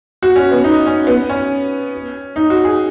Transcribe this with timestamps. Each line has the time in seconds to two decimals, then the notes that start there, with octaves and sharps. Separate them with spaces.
0.23 F#4
0.36 C#4
0.51 B3
0.64 D#4
0.86 C#4
1.07 B3
1.30 C#4
2.36 D#4
2.50 F#4
2.64 G#4